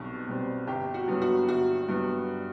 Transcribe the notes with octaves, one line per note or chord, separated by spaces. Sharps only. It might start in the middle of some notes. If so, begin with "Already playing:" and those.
Already playing: B1 B2 G3 C4
B2 G3 C4
G1 G4
F#4
G2 F#3 B3
F#4
G1 F#4
G2 F#3 B3